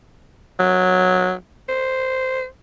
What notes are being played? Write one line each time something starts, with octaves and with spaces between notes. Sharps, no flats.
F#3
C5